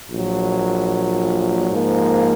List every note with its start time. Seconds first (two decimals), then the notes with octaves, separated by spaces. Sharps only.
0.11 A#1 A#2 F#3
1.71 G#2 F3 A#3